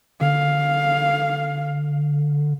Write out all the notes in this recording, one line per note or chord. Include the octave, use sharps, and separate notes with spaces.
D3 F5